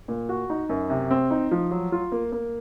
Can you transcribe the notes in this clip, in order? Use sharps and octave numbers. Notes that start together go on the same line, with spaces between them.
A#2
F#4
D#4
F#2
C3
C4
D#4
F3
F#3
F4
A#3
A#3